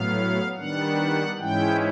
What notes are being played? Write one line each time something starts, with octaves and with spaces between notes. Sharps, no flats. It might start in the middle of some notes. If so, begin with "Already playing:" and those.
Already playing: A2 F#3 B3 F5
D#3 G3 B3 D4 F#5
G#2 E3 G#3 C#4 E4 G5